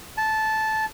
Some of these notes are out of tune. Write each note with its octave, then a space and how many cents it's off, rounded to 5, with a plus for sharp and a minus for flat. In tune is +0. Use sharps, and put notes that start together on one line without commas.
A5 -10